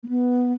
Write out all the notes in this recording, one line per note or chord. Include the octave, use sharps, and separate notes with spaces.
A#3
B3